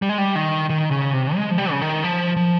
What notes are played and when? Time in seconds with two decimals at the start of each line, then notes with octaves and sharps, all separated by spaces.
0.02 G3
0.09 G#3
0.18 G3
0.36 D#3
0.70 D#3
0.91 C#3
1.13 C3
1.36 G#3
1.51 F3
1.58 G3
1.71 C#3
1.82 D#3
2.04 F3
2.36 F3